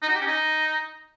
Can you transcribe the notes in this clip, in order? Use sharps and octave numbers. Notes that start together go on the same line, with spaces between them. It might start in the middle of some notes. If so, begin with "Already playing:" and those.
D#4
F#4
G4
C#4
D#4